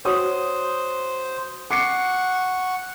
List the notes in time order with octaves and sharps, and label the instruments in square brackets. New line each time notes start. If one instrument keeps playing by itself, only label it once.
[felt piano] F#4 C#5 D#6 [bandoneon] C5
[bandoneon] F#5 C#6 [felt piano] D6 C7 C#7